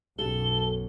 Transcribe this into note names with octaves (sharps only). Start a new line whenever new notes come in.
B1 F#2 A4 G7